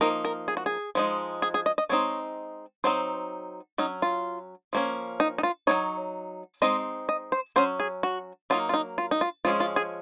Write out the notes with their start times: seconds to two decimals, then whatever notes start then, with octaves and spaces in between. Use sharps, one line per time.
0.01 F3 A#3 D#4 A#4
0.25 A#4
0.48 G#4
0.57 F#4
0.66 G#4
0.95 F3 G#3 D#4
1.42 G#4
1.54 G#4
1.66 D#5
1.78 D#5
1.89 G#3 C4 D#4 C#5
2.84 F#3 C4 D#4 C5
3.78 F#3 C#4 D#4
4.02 F4
4.73 F3 A#3 C#4
5.20 D#4
5.38 D#4
5.43 F4
5.67 F#3 C4 D#4 C#5
6.62 G#3 C4 D#4 D#5
7.09 D#5
7.32 C5
7.56 F#3 C#4 C5
7.80 G#4
8.03 F#4
8.50 F#3 A#3 D#4 F4
8.69 F4
8.74 D#4
8.98 F4
9.11 D#4
9.21 F4
9.45 F3 G#3 C#4 F4
9.60 F4
9.76 G#4